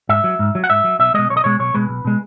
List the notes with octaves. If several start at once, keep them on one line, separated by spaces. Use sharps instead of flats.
G#2 E5
F#3
G#2
F#3
F#5
G#2 E5
F#3
B1 E5
B2 G#3 D#5
B1 C#5
D#5
B2 G#3 C#5
B1 C#5
B2 G#3 B4
B1
B2 G#3